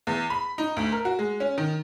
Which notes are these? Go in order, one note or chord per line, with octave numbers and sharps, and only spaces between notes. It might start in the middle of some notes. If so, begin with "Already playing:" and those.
E2
B5
D#4
D2
A#4
F#4
G#3
C#4
D#3